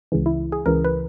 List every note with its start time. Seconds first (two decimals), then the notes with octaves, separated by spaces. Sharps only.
0.12 C#2 C#3 E3
0.26 E4
0.52 G#4
0.66 C#2 C#3 E3 A#4
0.84 B4